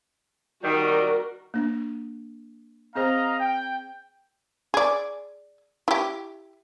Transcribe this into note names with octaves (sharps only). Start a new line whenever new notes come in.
D#3 G3 F#4 A#4
A#3 D4
C4 G#4 C5 D#5 F5 A#5
G5
G#4 D5
E4 G4